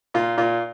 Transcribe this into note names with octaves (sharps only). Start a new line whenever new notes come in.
A#2 F4
A#2 F4